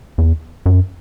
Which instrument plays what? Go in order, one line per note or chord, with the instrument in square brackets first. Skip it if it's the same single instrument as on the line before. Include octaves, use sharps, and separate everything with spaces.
[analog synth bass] E2
F#2